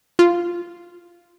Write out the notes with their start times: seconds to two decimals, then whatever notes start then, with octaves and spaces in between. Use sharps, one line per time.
0.19 F4